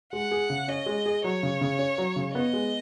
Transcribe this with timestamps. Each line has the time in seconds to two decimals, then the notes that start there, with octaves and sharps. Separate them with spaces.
0.13 G#3 F#5
0.31 G#4
0.50 C#3
0.68 C#4 D#5
0.86 G#3
1.06 G#4
1.24 F#3 C#5
1.43 C#3
1.61 C#3
1.79 C#4
1.98 F#3
2.16 C#3
2.35 B3 D#5
2.53 G#3